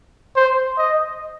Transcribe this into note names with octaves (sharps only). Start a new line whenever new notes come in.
C5
D#5